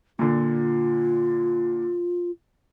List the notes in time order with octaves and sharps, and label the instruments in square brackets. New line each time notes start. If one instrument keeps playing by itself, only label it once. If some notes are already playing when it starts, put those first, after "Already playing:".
[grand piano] A#2 D3 [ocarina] F4